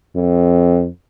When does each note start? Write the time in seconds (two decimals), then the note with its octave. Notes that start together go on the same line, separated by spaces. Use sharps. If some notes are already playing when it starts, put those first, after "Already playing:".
0.16 F2